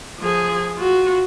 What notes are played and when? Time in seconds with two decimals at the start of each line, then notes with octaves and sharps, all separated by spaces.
0.19 F3 G#4
0.77 F4 F#4